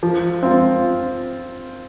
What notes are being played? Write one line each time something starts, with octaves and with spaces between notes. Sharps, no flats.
F3
C4 F4